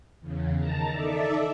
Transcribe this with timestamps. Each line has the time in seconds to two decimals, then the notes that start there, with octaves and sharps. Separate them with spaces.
0.21 E2 C#3
0.56 D#3 A5 A#5
0.91 D#4 A4 D5 E5